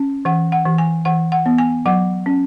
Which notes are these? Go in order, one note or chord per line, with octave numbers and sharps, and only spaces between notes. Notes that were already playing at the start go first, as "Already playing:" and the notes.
Already playing: C#4
E3 F#5
F#5
E3
G#5
E3 F#5
F#5
B3
G#5
F#3 F#5
C#4